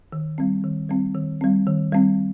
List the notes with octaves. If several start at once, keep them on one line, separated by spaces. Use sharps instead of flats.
D#3
G3 C4
D#3
G3 C4
D#3
G3 C4
D#3
G3 C4